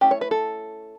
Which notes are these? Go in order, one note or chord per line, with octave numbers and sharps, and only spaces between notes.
A3 C#4 E4 G4
C#5
B4
A4